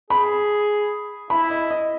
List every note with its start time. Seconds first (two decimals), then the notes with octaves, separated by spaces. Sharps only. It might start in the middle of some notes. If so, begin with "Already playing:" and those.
0.10 G#4 B5
1.30 E4 B5
1.50 D#5
1.71 D#5